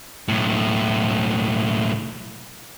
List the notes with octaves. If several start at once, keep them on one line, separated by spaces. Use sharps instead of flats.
B1 A2